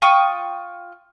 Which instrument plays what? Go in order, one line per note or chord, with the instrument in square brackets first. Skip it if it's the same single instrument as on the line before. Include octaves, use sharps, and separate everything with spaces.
[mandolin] F4 G5 C#6 D#6